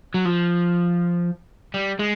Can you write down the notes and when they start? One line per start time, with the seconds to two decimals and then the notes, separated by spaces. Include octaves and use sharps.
0.14 F#3
0.25 F3
1.74 G3
1.99 G#3